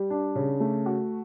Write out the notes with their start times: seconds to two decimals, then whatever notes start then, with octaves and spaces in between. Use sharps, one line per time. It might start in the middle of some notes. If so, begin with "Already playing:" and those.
Already playing: G3
0.10 D4
0.35 C#3
0.60 A3
0.86 F#4